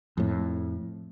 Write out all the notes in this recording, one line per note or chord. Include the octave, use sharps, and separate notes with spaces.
F2 A2